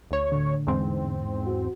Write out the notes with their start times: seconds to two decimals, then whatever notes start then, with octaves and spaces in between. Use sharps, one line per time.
0.11 D2 C#5
0.32 A2 D3
0.67 E2 G#2 C4
1.47 F#4